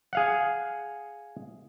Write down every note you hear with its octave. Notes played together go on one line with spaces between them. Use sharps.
G#4 F5 F#5